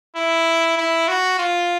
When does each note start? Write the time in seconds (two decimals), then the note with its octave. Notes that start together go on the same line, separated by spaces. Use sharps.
0.16 E4
0.77 E4
1.08 F#4
1.38 F4